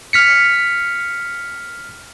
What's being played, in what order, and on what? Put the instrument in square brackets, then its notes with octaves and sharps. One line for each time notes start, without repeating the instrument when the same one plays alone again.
[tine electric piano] F6 B6 C#7